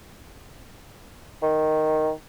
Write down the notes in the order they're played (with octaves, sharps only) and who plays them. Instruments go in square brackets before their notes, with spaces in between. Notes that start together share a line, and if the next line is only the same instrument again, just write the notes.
[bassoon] D#3